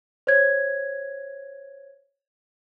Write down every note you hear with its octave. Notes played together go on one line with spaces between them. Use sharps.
C5 C#5 G#6